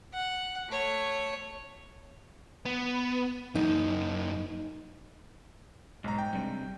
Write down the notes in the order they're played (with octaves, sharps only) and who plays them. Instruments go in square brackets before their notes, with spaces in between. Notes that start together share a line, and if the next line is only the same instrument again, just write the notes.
[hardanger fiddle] F#5
A3 C#5
[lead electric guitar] B3
[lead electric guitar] F#2 A#3 [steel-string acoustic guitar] D#4
[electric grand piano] B1 A#5 [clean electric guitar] G#2
[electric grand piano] G5
[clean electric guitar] G2 C3